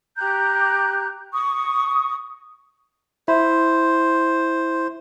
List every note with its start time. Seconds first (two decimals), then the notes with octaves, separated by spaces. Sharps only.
0.16 G4 A#5 F#6 G6
1.33 C#6 D#6
3.28 E4 C5